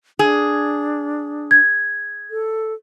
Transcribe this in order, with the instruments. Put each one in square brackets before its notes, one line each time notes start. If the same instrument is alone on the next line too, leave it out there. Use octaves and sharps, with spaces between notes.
[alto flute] D4 [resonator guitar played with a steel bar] G#4
[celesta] G#6
[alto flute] A4